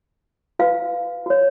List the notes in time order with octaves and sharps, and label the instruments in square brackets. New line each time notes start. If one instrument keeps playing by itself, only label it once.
[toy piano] F#4 B4 F5
F#4 C#5